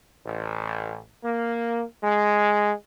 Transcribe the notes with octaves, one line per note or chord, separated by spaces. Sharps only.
A1
A#3
G#3